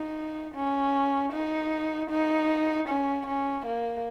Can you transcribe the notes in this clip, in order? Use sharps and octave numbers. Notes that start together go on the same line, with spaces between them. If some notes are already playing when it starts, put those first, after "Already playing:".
Already playing: D#4
C#4
D#4
D#4
C#4
C#4
A#3